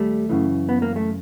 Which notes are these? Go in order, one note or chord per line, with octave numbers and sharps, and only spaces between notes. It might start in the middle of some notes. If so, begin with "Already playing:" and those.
Already playing: D#2 G3 A3
F#2 C#3 E3
B3
A#3
A3